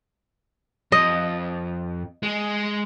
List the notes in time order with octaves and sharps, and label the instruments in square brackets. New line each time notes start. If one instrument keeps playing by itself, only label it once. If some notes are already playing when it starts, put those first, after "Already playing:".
[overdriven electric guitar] F2 [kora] D#5
[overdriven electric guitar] G#3